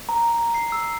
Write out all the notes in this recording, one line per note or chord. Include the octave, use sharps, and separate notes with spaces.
A#5
C7
E6